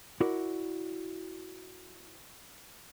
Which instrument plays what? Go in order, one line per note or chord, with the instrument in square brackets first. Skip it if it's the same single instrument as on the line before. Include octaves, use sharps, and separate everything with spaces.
[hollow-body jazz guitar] E4 F#4 A#4 D5